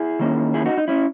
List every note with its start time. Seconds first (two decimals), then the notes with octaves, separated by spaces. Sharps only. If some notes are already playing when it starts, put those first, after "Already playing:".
Already playing: E4 G#4
0.19 D#3 A#3 C#4
0.54 E4 G#4
0.66 D#4 F#4
0.77 D#4
0.88 C#4 E4